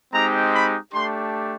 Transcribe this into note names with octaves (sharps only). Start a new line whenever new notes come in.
G#3 C4 D#4 G4 A#5
B5
A3 D4 G4 C6